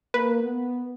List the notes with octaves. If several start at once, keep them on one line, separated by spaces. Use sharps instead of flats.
A#3 B4
B3